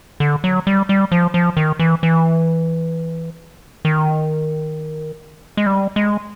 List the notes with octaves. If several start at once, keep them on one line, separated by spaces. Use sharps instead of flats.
D3
F#3
G3
G3
F3
F3
D#3
E3
E3
D#3
G#3
G3
G#3